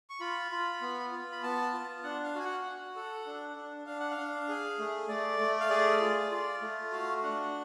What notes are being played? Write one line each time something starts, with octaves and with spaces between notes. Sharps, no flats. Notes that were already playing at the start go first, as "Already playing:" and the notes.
C#6
F4 B5
F4
B3
F4
B5
B3 A5
F4
D4 F#5
F5
F#4 G#5
F#5
F#4
A4
D4
D4
D4 F5
F#5
F5
D4
G#4
A3
A3 D5
A3
F5
G#4 D5
F4
F4
A3
F#4 F5
D4 F#5